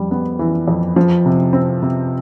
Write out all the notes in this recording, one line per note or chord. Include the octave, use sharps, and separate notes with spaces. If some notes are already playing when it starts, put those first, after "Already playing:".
Already playing: F2 G3
B3
E3
F2
F3
C3
C4
C3